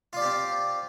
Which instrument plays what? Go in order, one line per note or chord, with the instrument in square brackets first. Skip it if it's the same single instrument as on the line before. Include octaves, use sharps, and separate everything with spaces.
[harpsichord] F4
D5
G4
C4